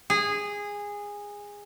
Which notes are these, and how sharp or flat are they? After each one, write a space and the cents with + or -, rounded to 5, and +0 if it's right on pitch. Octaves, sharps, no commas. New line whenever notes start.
G#4 -15